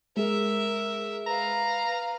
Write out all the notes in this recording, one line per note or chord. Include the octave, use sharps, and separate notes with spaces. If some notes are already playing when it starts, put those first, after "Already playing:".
G#3 G#4 A#4 E5
B4 F5 A#5